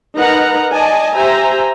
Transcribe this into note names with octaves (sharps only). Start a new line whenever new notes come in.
D#4 A#4 B4 F#5 A#5
D5 D#5 G#5 A5
G4 C5 E5 G#5 A#5